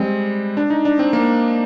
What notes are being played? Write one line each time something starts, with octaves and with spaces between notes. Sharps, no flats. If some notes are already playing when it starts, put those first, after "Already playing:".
Already playing: G3 G#3 C4
D4
D#4
D4
C4
A#3